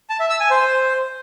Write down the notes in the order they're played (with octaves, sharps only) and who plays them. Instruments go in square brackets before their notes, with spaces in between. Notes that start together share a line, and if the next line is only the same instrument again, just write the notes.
[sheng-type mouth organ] A5
E5
E6
G#5
C5